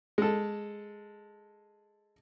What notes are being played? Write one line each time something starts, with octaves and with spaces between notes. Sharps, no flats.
G#3 A4